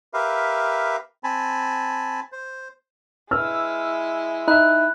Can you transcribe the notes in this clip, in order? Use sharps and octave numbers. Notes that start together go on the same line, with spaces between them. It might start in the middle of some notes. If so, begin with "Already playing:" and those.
G4 A#4 B4 E5 F5
C4 G#5 A5 B5
C5
G#3 E4 B4 E6 F6
D#4 E5 B5 F#6